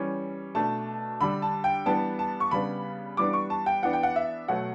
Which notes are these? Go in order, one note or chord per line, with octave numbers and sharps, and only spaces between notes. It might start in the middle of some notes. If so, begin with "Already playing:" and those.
Already playing: E3 G3 C#4
B2 A3 D4 A5
D3 G3 D4 B5
A5
G5
E3 G3 B3 D4 A5
A5
C#6
C#3 G3 B3 D4 B5
E3 G3 B3 D4 D6
C#6
A5
G5
E3 B3 D4 F#5
G5
F#5
E5
B2 F#3 A3 F#5